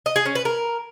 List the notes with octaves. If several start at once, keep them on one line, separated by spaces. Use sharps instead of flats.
D#5
G#4
C#4
B4
A#4